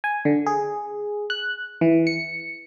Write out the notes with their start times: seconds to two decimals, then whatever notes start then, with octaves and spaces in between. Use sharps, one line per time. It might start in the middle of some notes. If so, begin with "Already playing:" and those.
0.04 G#5
0.25 D3
0.46 G#4
1.30 F#6
1.81 E3
2.07 C#7